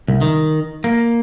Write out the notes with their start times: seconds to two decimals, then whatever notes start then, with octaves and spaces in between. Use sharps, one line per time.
0.08 C2
0.21 D#3
0.84 A#3